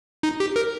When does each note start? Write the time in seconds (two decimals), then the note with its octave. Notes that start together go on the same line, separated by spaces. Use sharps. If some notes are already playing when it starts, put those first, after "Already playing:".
0.23 D#4
0.40 G4
0.56 A#4